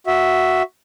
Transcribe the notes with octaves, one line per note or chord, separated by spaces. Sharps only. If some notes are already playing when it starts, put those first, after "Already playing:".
F#4 E5